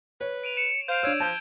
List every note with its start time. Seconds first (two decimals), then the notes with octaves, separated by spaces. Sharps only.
0.21 B4 C#5
0.43 D7 D#7 F7
0.57 C#7 E7
0.88 C5 F5 G6 D7
1.03 D4 C#5 E6 G#6 D7
1.20 F3 A5 G6